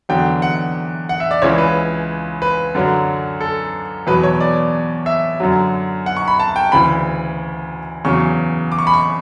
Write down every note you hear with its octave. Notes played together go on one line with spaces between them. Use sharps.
E2 D3 F#3 G5
F#5
F#5
E5
D5
C#2 C#3 E3 C#5
B4
B4
F#2 D3 F#3
A4
E2 B2 F#3 B4
C#5
D5
E5
F#2 D3 F#3
F#5
C#6
B5
A5
G5
D2 C#3 E3 B5
E2 C#3 F#3 C#6
D6
C#6
B5
C#6